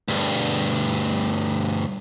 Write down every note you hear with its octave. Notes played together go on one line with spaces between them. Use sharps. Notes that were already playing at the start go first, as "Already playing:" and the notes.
D2 G2